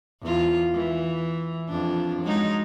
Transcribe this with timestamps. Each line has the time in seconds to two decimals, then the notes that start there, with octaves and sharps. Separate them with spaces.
0.22 E2 F4
0.74 E3
1.70 F2 D4
2.23 F#3 G#3 D#4